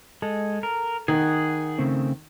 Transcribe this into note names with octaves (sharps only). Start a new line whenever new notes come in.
G#3 A4
A#4
D#3 G#4 F#5
C#3 A3 C4